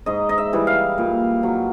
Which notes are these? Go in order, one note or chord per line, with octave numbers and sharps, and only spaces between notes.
G#2 D#5
D#5
E5
E3 G3
F5
A#2
F#3